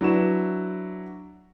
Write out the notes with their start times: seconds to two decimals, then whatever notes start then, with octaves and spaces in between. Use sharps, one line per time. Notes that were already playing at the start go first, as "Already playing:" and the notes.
0.01 F#3 D4 E4 F#4 B4 E7